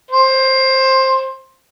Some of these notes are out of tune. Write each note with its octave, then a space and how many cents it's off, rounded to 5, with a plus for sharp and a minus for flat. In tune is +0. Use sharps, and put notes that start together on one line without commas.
C5 +15